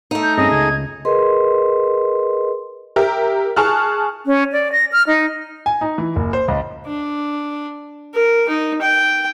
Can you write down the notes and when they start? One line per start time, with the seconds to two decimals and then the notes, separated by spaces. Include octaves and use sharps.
0.11 A3 D#4
0.23 G6
0.37 G2 C4 C#4 G#4 D#5 A#6
0.51 C#2 G#6
1.05 G#4 A#4 B4 D#5 C6
2.96 G4 A#4 E5
3.56 G#4 A5 C#6 F6 F#6
4.26 C#4
4.52 D5
4.72 A#6
4.92 F6
5.07 D#4
5.66 G#5
5.81 D#4
5.98 E3
6.16 F#1
6.33 C5
6.48 C#2
6.86 D4
8.14 A#4
8.48 D#4
8.81 G5